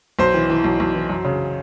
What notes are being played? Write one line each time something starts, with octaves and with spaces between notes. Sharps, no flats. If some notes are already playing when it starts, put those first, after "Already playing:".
B1 C5
E3
E3
B1
B1
E3
F#2
C#3